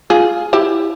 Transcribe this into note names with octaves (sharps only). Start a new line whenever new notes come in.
F4 G#4
E4 G4